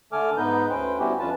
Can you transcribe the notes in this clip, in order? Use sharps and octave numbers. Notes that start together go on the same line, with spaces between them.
D3 A3 A4 G#5 D6 F6
G#2 B3 D#4 B4 D#5 G6
D2 C#4 B4 C5 G5
G3 B3 C#4 E4 F#4 G4
F2 C#4 F4 B4 A5